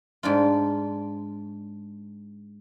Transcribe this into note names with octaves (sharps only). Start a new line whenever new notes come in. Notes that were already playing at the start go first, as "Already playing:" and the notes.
G#2 D4 F4